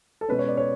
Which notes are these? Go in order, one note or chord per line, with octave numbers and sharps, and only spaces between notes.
A4
B2 G#3 C#4 B4
C#5
D5
C#5